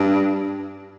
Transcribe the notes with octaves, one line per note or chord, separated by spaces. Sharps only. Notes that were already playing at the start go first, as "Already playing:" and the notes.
Already playing: G2